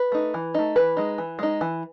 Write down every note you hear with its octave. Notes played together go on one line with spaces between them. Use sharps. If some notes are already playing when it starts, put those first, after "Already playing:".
Already playing: B4
A3 D#4
E3
A3 D#4
E3 B4
G#3 D#4
E3
G#3 D#4
E3